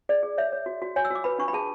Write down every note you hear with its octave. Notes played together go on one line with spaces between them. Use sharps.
G#4 D5
G#4
C#5 E5
C#5
F#4
F#4
C#5 G#5
E6
F#4 D6
B4 B5
D4 C#6
B5
G#4 A5